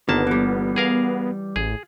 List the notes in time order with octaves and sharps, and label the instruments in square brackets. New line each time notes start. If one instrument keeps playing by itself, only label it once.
[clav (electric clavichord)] G1 A#3 A5 [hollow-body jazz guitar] D#3 [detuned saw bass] B3
[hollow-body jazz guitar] E3 G3
[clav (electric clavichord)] G#4 A#4 F5
[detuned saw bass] A1 [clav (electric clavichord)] G#4